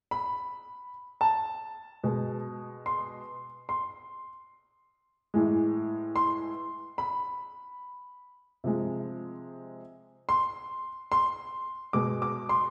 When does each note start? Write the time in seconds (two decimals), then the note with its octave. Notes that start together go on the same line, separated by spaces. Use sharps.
0.11 B5
1.21 A5
2.03 B2 G#3
2.86 C6
3.69 C6
5.34 A2 E3 G#3
6.16 C6
6.98 B5
8.64 C3 F3 G#3
10.29 C6
11.12 C6
11.93 B2 G#3 D6
12.22 D6
12.49 C6